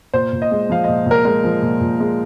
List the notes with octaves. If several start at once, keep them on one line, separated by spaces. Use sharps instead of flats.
A#2 C5
A#2
D#5
G#3
F3 F5
D#5
A#2
A#2 A#4
G#3 A#4
F3
A#2
A#2
G#3